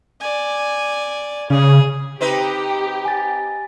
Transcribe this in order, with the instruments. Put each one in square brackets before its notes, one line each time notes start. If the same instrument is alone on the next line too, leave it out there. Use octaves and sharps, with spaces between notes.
[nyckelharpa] D5 G#5
[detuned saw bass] C#3 [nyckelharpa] G#4
[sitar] C4 D#4 B4 [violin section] G4
[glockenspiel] G#5 A6